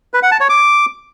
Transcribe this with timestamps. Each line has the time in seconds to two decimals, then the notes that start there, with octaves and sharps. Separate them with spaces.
0.14 B4
0.23 F#5
0.31 A5
0.40 C#5
0.49 D6